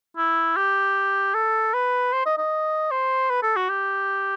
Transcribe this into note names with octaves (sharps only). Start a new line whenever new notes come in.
E4
G4
A4
B4
C5
D#5
D#5
C5
B4
A4
F#4
G4